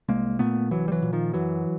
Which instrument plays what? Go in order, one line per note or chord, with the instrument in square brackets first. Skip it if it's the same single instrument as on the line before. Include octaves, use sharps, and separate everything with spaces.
[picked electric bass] C2 G#3 A#3
A#2 A3 B3
C2 E3 F#3
G3
E3 F#3
A#2
D#3 F3
F#2 E3 F#3